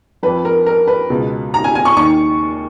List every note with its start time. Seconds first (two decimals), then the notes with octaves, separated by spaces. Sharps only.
0.23 F2 F3 B4
0.45 A#4
0.66 A#4
0.88 B4
1.10 C#2 B2
1.54 A#5
1.64 G#5
1.75 G#5
1.85 C#6
1.96 D#2 D#3 C#6